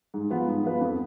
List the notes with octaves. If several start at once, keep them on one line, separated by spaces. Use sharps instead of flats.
G#2
F3 B3 F4 B4
G#2
F3 B3 F4 B4
F2